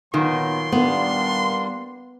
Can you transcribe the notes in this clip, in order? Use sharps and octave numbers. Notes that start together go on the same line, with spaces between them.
A#2 D#3 F#3 B3 C6
G3 A#3 B3 D4